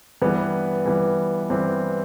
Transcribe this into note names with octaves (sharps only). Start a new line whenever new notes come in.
G2 E3 B3
G2 E3
G2 E3 C4